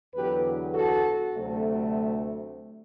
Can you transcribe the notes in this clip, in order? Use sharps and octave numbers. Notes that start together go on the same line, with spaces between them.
E2 D3 F#3 B3 G4 B4
F#4 A4
D2 C3 F#3 A3